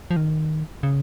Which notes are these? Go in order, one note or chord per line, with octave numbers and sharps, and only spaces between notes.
F3
D#3
C#3